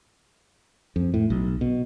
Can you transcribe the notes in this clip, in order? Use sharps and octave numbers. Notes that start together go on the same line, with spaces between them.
F2
A2
B1
B2